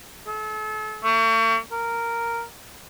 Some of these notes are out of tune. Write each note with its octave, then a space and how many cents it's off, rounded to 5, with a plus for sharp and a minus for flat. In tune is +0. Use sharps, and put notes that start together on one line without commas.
A4 -40
A3 +45
A#4 -5